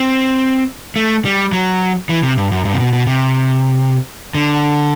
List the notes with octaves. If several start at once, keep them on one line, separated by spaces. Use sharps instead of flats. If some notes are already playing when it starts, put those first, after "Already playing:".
Already playing: C4
A3
G3
F#3
E3
C3
G2
F#2
G2
C3
B2
B2
C3
D3